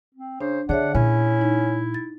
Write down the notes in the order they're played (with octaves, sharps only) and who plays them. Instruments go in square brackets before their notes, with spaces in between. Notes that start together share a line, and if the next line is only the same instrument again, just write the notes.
[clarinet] C4
[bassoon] C#3 [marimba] D4 [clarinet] C5
[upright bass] D3 [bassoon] D4 [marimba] G#4 C#5 E5 [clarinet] F#5
[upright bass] A#2 [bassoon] C#4 [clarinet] E4
[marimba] D#4
A6